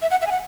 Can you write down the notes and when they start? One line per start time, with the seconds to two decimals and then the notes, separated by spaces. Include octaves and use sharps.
0.02 E5
0.11 F#5
0.22 E5
0.27 G#5
0.31 F#5